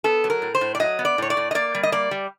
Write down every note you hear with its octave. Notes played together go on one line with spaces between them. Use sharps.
B3 A4
F#3
A#4
A2
C5
A2
D5
F#3 D#5
B3
D5
A2 C#5
D5
A2
D#5
A#3 D5
G3
D#5
A#3 D5
G3